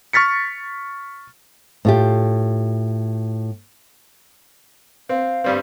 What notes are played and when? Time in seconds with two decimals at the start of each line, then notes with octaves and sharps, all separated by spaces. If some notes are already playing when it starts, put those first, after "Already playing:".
0.13 C#6 F6 A6 B6 C#7
1.85 A2 F4 G4
5.09 C4 F5
5.44 G2 G3 C4